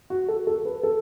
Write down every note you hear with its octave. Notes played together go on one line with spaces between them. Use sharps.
F#4
A4
A4
B4
A4